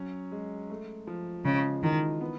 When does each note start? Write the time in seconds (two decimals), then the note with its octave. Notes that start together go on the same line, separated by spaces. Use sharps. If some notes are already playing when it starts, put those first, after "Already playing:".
Already playing: F#3 C#4
0.32 G#3
0.70 A3
1.07 F3
1.45 C#3 G#3
1.83 D#3 E3
2.21 B3